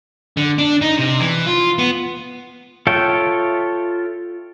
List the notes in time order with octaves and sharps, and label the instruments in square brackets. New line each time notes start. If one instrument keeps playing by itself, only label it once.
[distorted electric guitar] D3
D4
D#4
C3
E3
F4
B3
[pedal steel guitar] F4 A4 C#5 E5 G5